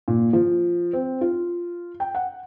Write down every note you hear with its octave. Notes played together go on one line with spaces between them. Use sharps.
A#2
F3
C4
F4
G5
F#5